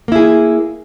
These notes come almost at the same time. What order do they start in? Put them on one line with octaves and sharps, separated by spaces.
A#3 E4 G#4